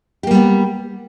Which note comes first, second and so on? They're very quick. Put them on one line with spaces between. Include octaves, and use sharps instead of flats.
G4 A#3 G3 B3